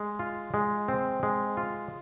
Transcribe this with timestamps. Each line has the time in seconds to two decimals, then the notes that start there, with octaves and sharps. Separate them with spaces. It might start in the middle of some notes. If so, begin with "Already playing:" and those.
Already playing: G#3
0.19 F4
0.54 G#3
0.88 C4
1.23 G#3
1.57 F4